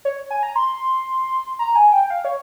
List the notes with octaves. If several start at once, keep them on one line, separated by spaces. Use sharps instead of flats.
C#5
G#5
A#5
C6
A#5
G#5
G5
F5
C#5